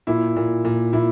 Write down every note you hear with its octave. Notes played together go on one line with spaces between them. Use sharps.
A#2 E4
A#2
A#2
A#2 E4